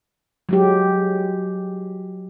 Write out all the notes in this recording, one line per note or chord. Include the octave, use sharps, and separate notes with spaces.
F#3 G#3 G4